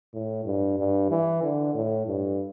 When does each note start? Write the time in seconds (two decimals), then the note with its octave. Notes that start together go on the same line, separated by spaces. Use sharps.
0.14 A2
0.45 G2
0.78 G2
1.10 E3
1.43 D3
1.75 A2
2.06 G2